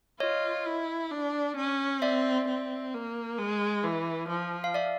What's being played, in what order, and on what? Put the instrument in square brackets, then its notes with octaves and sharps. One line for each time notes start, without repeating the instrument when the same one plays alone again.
[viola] F4 [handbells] C#5 D#5
[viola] E4
D4
C#4
[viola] C4 [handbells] D5 E5
[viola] C4
A#3
G#3
E3
F3
[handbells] F5
D5 E5